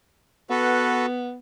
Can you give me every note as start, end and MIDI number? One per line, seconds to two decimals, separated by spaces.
0.50 1.37 59
0.50 1.06 66
0.50 1.06 69
0.50 1.06 71